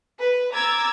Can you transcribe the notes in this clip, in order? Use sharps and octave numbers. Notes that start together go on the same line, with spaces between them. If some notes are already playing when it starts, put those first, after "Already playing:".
B4
A#5 D6 E6 G#6 A6